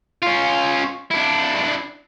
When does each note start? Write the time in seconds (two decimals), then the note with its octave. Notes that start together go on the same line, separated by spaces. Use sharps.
0.23 C#4 F4
1.11 D4 E4